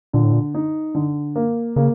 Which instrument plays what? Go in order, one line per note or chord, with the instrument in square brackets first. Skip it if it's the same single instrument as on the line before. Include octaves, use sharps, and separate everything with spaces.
[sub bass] A#2 [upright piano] D3
[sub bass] A2
A#2
[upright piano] D#4
D3
A#3
[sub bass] C#3 [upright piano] A#3